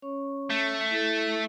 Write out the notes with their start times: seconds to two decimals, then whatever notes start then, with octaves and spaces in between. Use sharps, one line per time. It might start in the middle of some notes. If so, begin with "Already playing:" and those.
0.02 C#4 C#5 C#6
0.50 A3
0.91 E4 A4